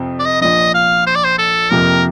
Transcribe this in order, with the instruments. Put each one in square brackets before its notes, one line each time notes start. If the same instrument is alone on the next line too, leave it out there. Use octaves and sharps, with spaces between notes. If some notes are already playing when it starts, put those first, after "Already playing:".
Already playing: [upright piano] F2 C3 F3 C4
[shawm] D5
D#5
[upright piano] A#1 A#2 F3 [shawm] D#5
[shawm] F5
C5
D5
C5
A4
[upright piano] F2 C3 F3 A#3 [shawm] A#4